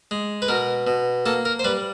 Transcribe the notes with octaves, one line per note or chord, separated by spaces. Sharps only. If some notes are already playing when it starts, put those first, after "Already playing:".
G#3
B4
B2 A#4
B2
A#3 A4
A#4
C5
G3 B4